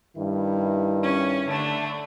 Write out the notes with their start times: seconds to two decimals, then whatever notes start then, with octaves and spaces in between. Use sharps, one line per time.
0.16 G2 D#3 E4
1.02 C#4
1.47 D3 A3 D4